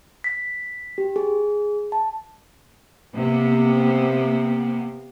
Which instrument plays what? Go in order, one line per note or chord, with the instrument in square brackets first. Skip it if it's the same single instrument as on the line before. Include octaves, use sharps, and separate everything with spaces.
[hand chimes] B6
G4
G#4
A5
[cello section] C3 A#3 B3